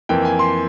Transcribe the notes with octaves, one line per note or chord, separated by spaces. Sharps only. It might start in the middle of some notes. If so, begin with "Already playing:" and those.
F2 E3 A#3 G5
G#5
C6